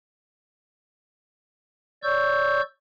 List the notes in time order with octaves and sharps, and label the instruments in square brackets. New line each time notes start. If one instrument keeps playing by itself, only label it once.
[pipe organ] C#5 D5 C#6 E6 G6